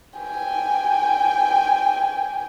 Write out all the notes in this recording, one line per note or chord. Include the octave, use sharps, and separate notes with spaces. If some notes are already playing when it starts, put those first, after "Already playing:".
G5 G#5